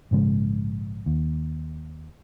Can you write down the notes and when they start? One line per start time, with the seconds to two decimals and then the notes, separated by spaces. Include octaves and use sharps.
0.11 A#1 G#2 C#3 G#3
1.06 D#2